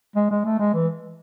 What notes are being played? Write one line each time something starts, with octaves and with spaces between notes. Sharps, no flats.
G#3
G#3
A3
G#3
E3